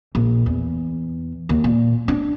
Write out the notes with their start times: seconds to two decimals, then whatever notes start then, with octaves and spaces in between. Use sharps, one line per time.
0.15 A#1
0.46 E2
1.49 D#2
1.64 A#2
2.08 D4